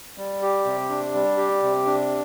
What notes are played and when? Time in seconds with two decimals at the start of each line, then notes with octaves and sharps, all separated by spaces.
0.18 G3
0.42 G4
0.66 C3
0.90 D4
1.14 G3
1.37 G4
1.62 C3
1.86 D4